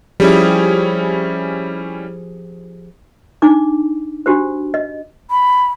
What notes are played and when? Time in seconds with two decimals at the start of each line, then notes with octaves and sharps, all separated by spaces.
0.20 F3 G3 C#4 E4 G4 G#4
3.42 D4 D#4 D6
4.26 D4 F#4 G4 C5
4.74 D#5
5.31 B5